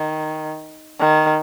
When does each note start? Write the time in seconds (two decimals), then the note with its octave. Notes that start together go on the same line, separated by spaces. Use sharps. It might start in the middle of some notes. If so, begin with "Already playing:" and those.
Already playing: D#3
0.99 D#3